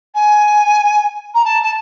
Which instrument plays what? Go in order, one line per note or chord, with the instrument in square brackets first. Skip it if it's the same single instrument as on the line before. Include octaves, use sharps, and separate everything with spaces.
[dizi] G#5
A#5
A5
A5